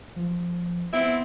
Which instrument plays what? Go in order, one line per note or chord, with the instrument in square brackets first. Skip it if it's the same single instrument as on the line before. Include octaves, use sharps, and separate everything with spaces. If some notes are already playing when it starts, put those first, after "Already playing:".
[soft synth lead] F3
[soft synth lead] B3 [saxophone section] C4 E4